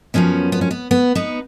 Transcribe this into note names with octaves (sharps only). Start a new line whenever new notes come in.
F#2 F3 B3 C#4
B3
C#4
B3
B3
B3 D#4